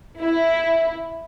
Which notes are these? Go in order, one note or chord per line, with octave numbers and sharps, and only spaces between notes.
E4